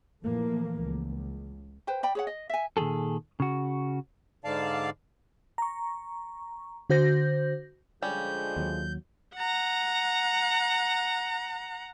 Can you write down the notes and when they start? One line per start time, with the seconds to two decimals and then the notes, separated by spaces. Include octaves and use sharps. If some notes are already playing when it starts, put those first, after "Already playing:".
0.23 A#2 E3 F3 A3 A#3
0.83 C#2
1.87 B4 C5 G5
2.03 D5 G5 B5
2.15 G#4 C#5 F#5
2.27 D#5
2.49 E5 G#5
2.77 A#2 D#3 F#3 G#4 A4
3.40 C#3 F#4
4.44 G#2 D3 D5 F5 A5
5.58 A#5 C#6
6.90 D3 F#4 C5 G6 A#6
8.02 D3 F3 G3 G#3 C#4 G6
8.56 D#2 F#3
9.36 F#5 A#5